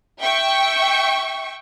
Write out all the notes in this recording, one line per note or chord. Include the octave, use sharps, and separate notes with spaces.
E5 G5 C#6